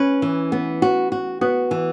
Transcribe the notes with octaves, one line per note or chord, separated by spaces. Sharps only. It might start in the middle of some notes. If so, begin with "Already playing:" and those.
Already playing: C#4 B4
E3
B3
F#4
F#4
B3 F#4
E3